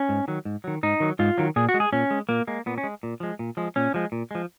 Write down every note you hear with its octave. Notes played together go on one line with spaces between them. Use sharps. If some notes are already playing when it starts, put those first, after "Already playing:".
Already playing: C#4
G#2
D#3 F#3
G#2
D#3 F#3
G#2 D#4
D#3 F#3
G#2 F4
D#3 F#3
A#2 G#4
F#4
G#3
G#4
A#2 C#4
G#3
A#2 A#3
G#3 A#3
A#2 B3
C#4
G#3
A#2
F3 G#3
A#2
F3 G#3
A#2 C#4
F3 G#3
A#2
F3 G#3